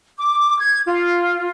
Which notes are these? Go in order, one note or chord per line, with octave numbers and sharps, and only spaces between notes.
D6
G#6
F4